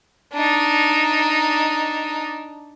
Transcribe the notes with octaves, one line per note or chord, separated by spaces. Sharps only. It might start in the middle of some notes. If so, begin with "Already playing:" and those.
D4 D#4